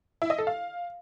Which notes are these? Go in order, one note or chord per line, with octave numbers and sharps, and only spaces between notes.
E4
D#5
A4
F5